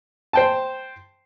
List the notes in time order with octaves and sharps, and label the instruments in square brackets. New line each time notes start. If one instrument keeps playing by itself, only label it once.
[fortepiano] C5 G5 A5